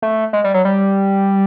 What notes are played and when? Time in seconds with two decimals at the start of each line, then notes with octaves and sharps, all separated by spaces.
0.02 A3
0.33 G#3
0.44 G3
0.54 F#3
0.65 G3